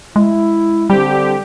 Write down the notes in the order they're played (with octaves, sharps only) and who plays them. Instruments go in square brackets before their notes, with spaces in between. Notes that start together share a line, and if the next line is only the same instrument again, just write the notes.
[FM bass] G#3 [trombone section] E4
[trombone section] D3 C4 [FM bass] G3 [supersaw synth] G4